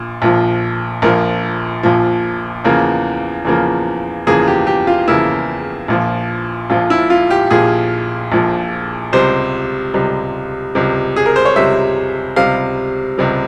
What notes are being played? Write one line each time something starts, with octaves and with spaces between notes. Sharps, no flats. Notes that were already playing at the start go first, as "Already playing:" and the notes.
Already playing: A#1 A#2
A#1 A#2 F3
A#1 A#2 F3 A#4
A#1 A#2 F3
E2 C#3 F3 A#3
E2 C#3 F3 A#3
E2 C#3 F3 A#3 G#4
G4
G4
F4
E2 C#3 F3 A#3 E4
A#1 A#2 F3
A#1 A#2 F3 F4
E4
F4
G4
A#1 A#2 F3 G#4
A#1 A#2 F3
C#2 C3 G3 C5
C#2 C3 G3
C#2 C3 G3
G#4
A#4
C5
C#5
C#2 C3 G3 E5
C#2 C3 G3 F5
C#2 C3 G3